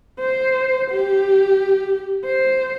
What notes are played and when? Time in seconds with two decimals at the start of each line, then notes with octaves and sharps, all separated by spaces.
0.20 C5
0.91 G4
2.25 C5